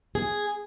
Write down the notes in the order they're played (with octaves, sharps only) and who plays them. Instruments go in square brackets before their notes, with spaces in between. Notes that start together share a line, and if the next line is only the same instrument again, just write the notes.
[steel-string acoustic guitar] G#4